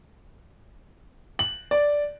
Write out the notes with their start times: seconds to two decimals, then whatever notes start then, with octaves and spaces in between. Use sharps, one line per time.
1.39 F#7
1.71 D5